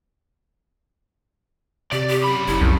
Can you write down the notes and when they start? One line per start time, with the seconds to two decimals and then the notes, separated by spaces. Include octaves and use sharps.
1.92 C3 G4 D5
2.08 G4
2.24 F#2 B5
2.48 F#1 E4
2.61 C2 F2